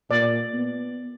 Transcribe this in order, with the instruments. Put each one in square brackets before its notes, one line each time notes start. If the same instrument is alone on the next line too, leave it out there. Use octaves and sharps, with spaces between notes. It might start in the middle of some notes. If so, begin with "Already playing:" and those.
[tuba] A#2 [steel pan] D5
[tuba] B3